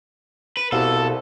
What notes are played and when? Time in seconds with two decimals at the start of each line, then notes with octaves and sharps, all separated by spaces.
0.57 B4
0.72 C2 B2 A4 F5 F#5